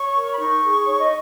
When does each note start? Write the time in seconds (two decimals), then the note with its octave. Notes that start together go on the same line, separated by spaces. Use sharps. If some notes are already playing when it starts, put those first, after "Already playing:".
Already playing: C#5 C#6
0.15 A#4
0.33 B5
0.39 D#4 C#6
0.64 G#4
0.86 D#4 C#5
0.99 D#5